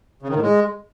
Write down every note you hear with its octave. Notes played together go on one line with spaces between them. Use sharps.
C#3
D#3
A2
G#3